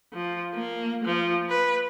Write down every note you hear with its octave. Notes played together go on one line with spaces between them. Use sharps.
F3
A#3
F3
B4